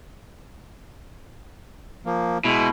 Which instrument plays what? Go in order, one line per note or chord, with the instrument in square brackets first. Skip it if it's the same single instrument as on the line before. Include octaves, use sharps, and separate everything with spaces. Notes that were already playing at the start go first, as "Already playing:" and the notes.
[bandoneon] F3 A#3
[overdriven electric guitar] B2 [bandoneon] G#3 E4